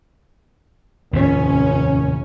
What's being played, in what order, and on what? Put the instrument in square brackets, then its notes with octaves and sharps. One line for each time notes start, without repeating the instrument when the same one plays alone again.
[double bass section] F1 C#4 [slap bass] D#2 A2 C3